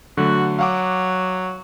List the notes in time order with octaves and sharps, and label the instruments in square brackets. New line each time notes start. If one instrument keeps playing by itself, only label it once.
[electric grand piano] D3 F#3 A3 [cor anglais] F#4
[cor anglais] F#3 [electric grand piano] F5 F#5 D6